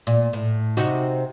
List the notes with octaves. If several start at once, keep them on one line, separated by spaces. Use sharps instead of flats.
A#2
A2
C3 D#4 F#4